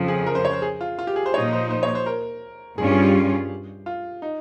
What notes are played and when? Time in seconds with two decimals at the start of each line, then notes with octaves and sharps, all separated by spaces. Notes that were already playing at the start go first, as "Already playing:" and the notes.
Already playing: F2 C#3 F3
0.08 G#4
0.26 A#4
0.35 C5
0.45 C#5
0.53 C5
0.62 G#4
0.81 F4
0.99 F4
1.07 G4
1.16 G#4
1.26 C5
1.34 A#2 F3 A#3 D#4 C#5
1.53 C5
1.70 C5
1.83 C#5
1.95 C5
2.06 A#4
2.78 G2 G3 C#4 F4 G#4
2.91 G#4
3.03 G4
3.86 F4
4.22 D#4